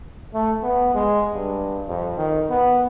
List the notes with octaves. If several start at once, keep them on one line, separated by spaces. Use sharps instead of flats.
A3
B3
G#3
G2
F2
D#3
B3